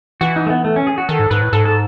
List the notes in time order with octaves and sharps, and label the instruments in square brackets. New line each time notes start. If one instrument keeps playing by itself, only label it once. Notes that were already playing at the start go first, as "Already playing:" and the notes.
[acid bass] E3 [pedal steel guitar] F#4
[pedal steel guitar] D#4
A3
B3
A3
C#4
G#4
F#4
[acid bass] D#3 [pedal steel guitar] A4
[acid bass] G#2
[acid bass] G#2 [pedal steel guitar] B4
[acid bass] A2
[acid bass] G#2 [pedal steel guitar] A4
[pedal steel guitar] A4